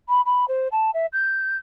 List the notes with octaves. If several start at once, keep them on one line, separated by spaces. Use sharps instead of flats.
B5
B5
C5
A5
E5
G6